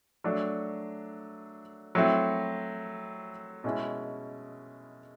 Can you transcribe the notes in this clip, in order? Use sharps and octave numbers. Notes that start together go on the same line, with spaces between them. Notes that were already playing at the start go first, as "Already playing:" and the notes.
F#3 A3 D4
F#3 A3 C4 E4
B2 G#3 C#4 E4